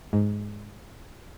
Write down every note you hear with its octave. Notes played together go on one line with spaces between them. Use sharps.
G#2